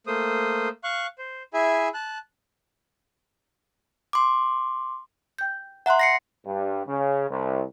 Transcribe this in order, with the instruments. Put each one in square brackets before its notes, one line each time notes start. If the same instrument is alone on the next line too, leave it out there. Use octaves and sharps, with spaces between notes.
[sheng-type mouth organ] A3 A#3 C5 D#6
F5 C#6 F#6
C5
E4 G#4 E5 G#5
A5 F#6
[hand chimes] C6 D6
[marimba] G5 G6
[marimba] E5 A#5 F#6 [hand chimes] F#5 C6
[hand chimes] A#6 C7 C#7
[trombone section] G2
C#3
C2